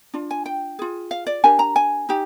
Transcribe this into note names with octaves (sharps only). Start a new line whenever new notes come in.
D4 F4
G#5
G5
F4 G#4
F5
D5
D4 G4 A#4 G#5
A#5
G#5
D#4 G4